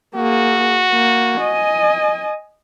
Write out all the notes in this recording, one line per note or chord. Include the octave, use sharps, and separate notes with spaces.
A#3 F#4 G#4
A#3
D#5 G#5